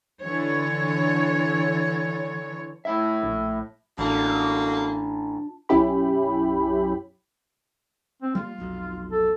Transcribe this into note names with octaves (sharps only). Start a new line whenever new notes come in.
D3 E3 C#5
A2 E4 E5
A#1
A1 B2 D3 A#3 D4 F4 A5
B1 F#2 C#4 E4 G4 B5
C4
G3 G#3 A#3 F4
F1 B1
A4